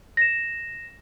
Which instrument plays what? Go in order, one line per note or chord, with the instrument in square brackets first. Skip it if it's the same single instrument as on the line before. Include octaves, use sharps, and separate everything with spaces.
[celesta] A#6 E7